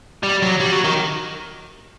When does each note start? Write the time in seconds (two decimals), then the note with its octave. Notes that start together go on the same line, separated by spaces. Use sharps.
0.23 G3
0.42 F#3
0.60 G3
0.72 F#3
0.85 D#3